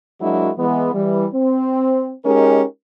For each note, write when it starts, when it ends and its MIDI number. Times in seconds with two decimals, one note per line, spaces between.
0.21 0.51 54
0.21 0.51 56
0.21 0.51 58
0.21 0.51 62
0.21 0.51 64
0.21 0.51 66
0.58 0.93 52
0.58 0.93 56
0.58 0.93 59
0.94 1.26 52
0.94 1.26 55
1.33 2.13 60
2.25 2.64 56
2.25 2.64 61
2.25 2.64 63
2.25 2.64 67
2.25 2.64 70